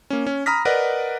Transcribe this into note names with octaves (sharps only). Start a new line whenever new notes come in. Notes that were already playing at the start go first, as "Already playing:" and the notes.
A#3 C#4
C#4
A#5 B5 D#6 F6 A#6 B6
A#4 B4 D5 D#5 F#5